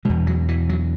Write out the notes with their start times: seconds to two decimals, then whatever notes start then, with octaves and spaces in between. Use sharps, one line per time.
0.05 E2 B2 G#3
0.27 F#3
0.48 E3
0.69 F#3